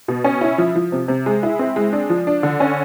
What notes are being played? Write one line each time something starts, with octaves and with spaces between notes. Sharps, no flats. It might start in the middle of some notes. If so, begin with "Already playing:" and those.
B2
C#4
E4
F3
F3
C3
C3
G#3
E4
C4
G#3
D4
F3
D4
D3
C#4